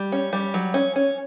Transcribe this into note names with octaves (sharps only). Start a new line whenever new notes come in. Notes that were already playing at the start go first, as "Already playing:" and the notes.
Already playing: G3
C#4
G3
F#3
C#4
C#4